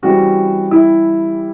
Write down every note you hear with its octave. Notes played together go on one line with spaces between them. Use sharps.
C#3 E3 G3 C4 F#4
E4